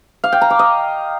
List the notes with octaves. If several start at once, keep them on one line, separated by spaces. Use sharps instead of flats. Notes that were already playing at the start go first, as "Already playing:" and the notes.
F5
G5
A#5
D6
D#5